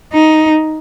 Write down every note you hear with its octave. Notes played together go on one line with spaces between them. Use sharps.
D#4